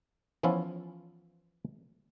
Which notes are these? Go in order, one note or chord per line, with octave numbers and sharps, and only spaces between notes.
E3 F3 B3 C#4 E4 F4